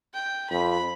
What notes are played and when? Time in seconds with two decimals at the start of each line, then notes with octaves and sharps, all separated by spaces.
0.14 G5
0.50 F2 B5